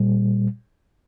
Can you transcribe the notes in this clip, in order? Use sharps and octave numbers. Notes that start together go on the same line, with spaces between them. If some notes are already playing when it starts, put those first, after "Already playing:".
Already playing: A#2 G3